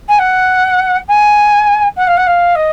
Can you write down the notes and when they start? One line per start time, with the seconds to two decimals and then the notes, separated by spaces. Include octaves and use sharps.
0.09 G#5
0.19 F#5
1.08 G#5
1.96 F#5
2.07 F5
2.17 F#5
2.26 F5
2.55 D#5